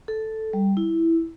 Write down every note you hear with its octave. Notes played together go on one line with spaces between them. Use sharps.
A4
G3
E4